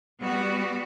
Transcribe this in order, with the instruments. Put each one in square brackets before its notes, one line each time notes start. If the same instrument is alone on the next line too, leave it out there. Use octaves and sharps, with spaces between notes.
[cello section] G3 B3 F#4